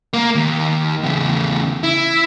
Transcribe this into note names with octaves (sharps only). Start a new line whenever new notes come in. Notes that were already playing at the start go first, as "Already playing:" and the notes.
A#3
D#2
E2 C#3
E4